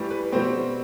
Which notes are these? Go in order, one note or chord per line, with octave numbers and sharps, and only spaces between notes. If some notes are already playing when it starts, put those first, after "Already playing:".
Already playing: A2 E3 G3
B4
B2 G3 C4 C5